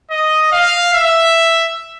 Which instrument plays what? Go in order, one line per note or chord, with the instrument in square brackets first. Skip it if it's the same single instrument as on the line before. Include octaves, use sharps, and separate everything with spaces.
[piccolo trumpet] D#5
F5
E5